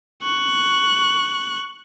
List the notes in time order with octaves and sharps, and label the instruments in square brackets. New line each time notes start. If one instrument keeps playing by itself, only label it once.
[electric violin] C#6 F#6